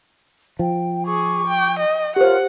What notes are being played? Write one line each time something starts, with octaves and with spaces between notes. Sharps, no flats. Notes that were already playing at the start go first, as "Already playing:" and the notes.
F3 G5
G#4 C#6 D6
G5
D#5
F4 G4 A#4 C5 C#5 F#5